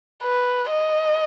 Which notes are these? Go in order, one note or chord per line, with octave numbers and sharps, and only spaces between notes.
B4
D#5